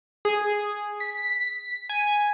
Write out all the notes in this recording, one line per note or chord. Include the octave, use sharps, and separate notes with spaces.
G#4
B6
G#5